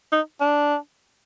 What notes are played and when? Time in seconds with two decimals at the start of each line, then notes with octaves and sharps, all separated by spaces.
0.12 D#4
0.41 D4